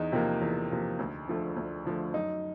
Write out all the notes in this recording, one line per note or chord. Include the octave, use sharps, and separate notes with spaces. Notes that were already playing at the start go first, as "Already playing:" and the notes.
Already playing: E2 D#4
C3 F3 A#3
E2
C3 F3 A#3
D2
D3 F3 A3
D2
D3 F3 A3
F#2 D#4